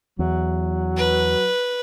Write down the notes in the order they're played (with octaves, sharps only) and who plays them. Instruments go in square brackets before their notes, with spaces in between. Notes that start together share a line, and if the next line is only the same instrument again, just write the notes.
[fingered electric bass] E2 [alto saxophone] F#3
[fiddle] B4